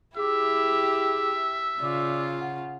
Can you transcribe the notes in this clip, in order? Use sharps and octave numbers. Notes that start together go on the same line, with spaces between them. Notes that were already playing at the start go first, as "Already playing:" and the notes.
E4 G4 G#4 E5 D6
C#3 F4 D5 D6
F#5